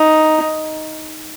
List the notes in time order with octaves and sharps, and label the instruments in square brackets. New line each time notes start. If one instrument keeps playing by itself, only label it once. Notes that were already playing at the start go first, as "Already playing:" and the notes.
Already playing: [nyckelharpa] D#4